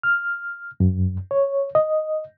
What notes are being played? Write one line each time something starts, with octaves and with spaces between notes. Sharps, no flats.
F6
F#2
C#5
D#5